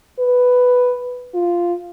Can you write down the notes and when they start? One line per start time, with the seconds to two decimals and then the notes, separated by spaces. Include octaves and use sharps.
0.19 B4
1.34 F4